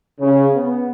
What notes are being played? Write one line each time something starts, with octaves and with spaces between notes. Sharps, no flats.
C#3
B3